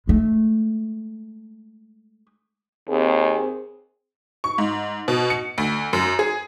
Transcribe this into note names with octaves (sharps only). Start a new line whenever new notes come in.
G#3 A3
D#2 C4 G#4
C#6
G#2
B2
C#7
D2
F#2
G#4